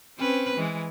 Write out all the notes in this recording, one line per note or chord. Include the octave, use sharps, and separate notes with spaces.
C4 C#4 B4
E3 G#3